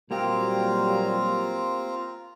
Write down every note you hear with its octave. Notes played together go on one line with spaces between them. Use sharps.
A#2 F#3 G3 A#3 C4 F4 G4 A#5